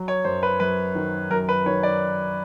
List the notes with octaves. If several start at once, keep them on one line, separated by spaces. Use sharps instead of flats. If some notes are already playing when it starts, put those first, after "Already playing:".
Already playing: F#3
C#5
F#2 C5
B4
F#2 B4
D#3
F#2 A#4
B4
D#3 C#5
D5